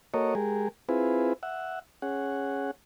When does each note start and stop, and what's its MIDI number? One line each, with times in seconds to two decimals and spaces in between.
0.14 0.34 58
0.14 0.34 66
0.14 0.34 69
0.14 0.34 70
0.14 0.34 73
0.14 0.34 75
0.35 0.68 56
0.35 0.68 67
0.35 0.68 68
0.35 0.68 70
0.89 1.33 60
0.89 1.33 64
0.89 1.33 65
0.89 1.33 68
0.89 1.33 71
1.43 1.79 76
1.43 1.79 78
2.02 2.71 61
2.02 2.71 68
2.02 2.71 78